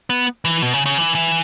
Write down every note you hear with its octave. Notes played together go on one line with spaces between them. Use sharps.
B3
E3
B2
C#3
C#3
E3
E3